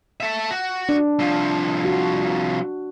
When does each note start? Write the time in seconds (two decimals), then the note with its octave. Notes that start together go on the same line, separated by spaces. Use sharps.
0.20 A4 E5
0.51 F#4
0.89 D4
1.19 C2 F3
1.85 F#4